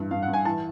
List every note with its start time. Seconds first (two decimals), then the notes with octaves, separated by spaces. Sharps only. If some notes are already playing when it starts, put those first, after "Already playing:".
Already playing: G2 E3
0.11 G2 F5
0.22 F#5
0.28 G2
0.33 G#5
0.45 E3 A5